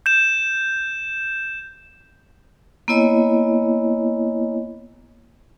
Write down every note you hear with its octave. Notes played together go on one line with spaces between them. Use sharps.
G6 E7
A#3 B3 E4 C#5 D#5 G#5